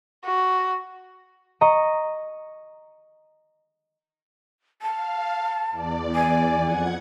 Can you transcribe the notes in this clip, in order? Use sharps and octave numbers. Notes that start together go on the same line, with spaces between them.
F#4
D#5 A#5 C#6
F5 A5
E2 D5
G#5
F2 F#5 G#6